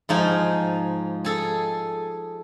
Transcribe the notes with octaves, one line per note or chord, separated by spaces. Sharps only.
G#2 F3 D#4 G#5
G#4 A4 G#5